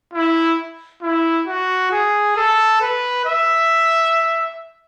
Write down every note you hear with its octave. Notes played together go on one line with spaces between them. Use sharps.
E4
E4
F#4
G#4
A4
B4
E5